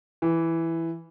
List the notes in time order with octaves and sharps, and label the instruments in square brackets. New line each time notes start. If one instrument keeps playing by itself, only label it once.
[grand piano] E3